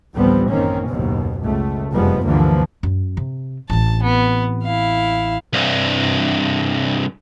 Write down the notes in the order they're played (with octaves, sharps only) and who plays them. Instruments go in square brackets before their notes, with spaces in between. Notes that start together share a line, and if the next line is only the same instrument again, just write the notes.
[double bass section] A1 D2 F3 G3 B3 C4
F#2 D#3 A#3 C4 C#4
F#1 D#2 G#2 B2
C#2 A3
F1 F#2 F3 G3 G#3 B3
D2 G2 D3 E3 F3 A#3
[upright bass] F#2
C3
[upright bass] A1 C4 [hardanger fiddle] A5
[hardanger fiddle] B3
E4 F5
[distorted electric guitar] C2 G2